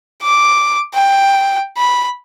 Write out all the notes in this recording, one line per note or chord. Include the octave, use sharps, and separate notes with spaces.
D6
G5
B5